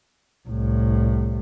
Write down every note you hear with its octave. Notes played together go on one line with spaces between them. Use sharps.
C2 A2